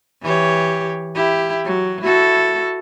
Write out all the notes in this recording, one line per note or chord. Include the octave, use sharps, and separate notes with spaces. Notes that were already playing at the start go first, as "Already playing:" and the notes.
E3 G4 C#5
E4 G4
F#3
E4 F#4 A4